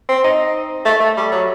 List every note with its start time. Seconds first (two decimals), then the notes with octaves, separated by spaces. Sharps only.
0.09 C4
0.24 D#4
0.85 A3
1.00 A3
1.17 G3
1.31 F#3